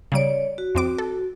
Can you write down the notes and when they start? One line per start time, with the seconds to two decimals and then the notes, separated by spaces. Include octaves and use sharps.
0.12 C#3 G3 C#5 D5 D7
0.58 F#4
0.75 F2 C4 D6
0.98 A4